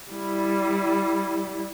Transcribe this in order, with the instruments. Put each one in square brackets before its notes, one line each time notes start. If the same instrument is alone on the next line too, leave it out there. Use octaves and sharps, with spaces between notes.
[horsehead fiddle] G3 E4